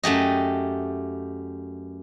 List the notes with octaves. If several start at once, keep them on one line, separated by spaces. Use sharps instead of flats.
F#2 A3 G4 D#5